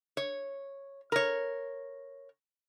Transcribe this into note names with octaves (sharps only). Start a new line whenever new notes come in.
C#5
A#4 C#5